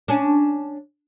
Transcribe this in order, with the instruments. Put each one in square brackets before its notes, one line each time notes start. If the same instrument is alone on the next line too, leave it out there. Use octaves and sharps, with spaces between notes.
[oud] C#4 D4